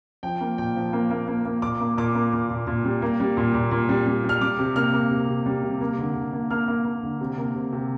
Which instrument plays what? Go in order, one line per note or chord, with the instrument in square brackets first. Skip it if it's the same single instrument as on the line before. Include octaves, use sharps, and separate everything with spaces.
[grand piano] F3 G5
A#3
A#2 G5
F3
A#3
A#3
A#3
A#3
A#2 D6
A#3
A#2 D6
A#3
A#2
A#2
A#2
G3
A#3
G3
A#2
A#2
A#2
G3
G3
G3
F6
G3 D6
C3
A#3 F6
A#3
C3
C3
G3
C3
A#3
D3
D3
A#3
A#3 F6
A#3
A#3
D3
C3
A#3
C3
C3